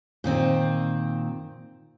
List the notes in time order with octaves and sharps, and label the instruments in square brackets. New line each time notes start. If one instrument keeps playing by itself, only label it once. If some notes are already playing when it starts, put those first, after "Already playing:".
[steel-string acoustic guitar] A#2 D#3 C4